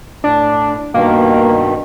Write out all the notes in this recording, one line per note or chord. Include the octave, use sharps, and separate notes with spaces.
A2 D4
G2 B2 D#3 A#3